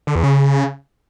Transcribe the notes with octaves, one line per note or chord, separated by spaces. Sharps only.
D3
E2
C#3